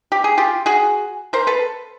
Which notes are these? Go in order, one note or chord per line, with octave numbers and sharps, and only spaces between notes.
G4
G#4
F4 G4
F#4 G#4
A#4 C5
A4 B4